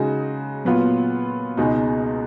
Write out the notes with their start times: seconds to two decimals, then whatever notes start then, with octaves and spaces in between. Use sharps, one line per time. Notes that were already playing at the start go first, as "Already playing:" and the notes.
Already playing: C#3 G#3 D#4 F#4
0.65 A#2 F#3 B3 F4
1.57 C#2 B2 G#3 D#4 F#4